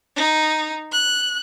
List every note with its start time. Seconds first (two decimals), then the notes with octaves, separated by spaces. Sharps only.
0.16 D#4
0.92 F#6